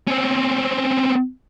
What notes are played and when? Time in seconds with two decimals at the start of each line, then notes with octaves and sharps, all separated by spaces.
0.08 C4 C#4